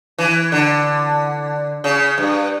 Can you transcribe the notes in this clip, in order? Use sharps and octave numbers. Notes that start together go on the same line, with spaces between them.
E3
D3
C#3
G2